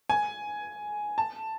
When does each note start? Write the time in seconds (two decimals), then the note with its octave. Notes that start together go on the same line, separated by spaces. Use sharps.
0.10 G#5
1.18 A5